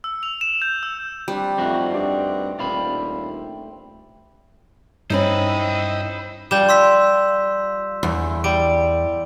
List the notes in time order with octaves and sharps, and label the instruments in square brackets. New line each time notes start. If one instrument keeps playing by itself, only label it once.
[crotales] E6
F7
E7
G6
E6
[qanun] G3 [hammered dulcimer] C4 D4 G4
[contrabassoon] F2 [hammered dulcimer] A3 [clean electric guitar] C4 D#4 F#4
[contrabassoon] G2 [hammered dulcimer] D5
[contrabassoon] D#1 [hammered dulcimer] C4 [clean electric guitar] D5 F5 B5
[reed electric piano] G2 [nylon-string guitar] C4 C#4 D#4 [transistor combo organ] E4 D#5 [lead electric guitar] C5 B5
[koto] F3 G3 [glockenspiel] G6 E7
[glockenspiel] C6 E6 B6
[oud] E2
[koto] G3 [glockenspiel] D7